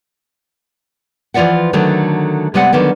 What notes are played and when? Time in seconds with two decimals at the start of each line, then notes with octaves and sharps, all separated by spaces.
1.34 E3 F3 F4 D5 E5 F#5
1.73 D3 D#3 F#3 A3
2.54 C3 G3 G#3 B3 D5 F#5
2.73 D3 D#3 F#3 B3